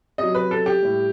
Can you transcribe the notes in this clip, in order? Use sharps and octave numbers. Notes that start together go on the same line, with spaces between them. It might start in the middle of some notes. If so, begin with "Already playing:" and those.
C3 F#3 D#5
B4
A4
G4
A2 G3